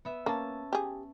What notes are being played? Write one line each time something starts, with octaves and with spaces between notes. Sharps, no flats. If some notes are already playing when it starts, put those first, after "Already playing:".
B3 E5
A#3 C#4 A5
G4 G#4